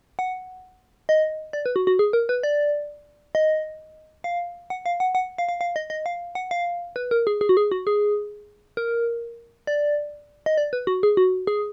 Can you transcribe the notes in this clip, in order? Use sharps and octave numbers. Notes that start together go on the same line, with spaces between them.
F#5
D#5
D5
B4
F#4
F#4
G#4
A#4
B4
D5
D#5
F5
F#5
F5
F#5
F#5
F5
F5
F5
D#5
D#5
F5
F#5
F5
B4
A#4
G#4
G#4
F#4
G#4
F#4
G#4
A#4
D5
D#5
D5
B4
F#4
G#4
F#4
G#4